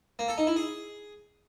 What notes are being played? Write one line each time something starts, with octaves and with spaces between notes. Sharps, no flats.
A#3
A4
D#4
E4
G#4